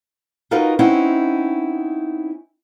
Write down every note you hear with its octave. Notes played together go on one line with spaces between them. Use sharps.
D#4 F4 F#4 A#4 B4 D#5
C4 C#4 D#4 E4 D#5 F#5